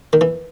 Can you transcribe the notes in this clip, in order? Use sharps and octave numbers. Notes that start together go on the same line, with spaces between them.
D#3
E3